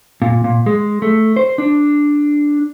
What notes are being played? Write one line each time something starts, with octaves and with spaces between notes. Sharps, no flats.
A#2
A#2
G#3
A3
C5
D4